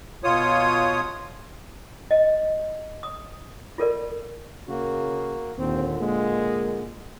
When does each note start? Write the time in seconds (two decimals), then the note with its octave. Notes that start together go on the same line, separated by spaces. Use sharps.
0.24 B2 F4 C#5 D#6
2.11 D#5
3.03 D#6
3.78 F4 A4 A#4 D5
4.68 C#3 A#3 F#4
5.58 D#2 A#2 D3 C4
5.99 G#3 A#3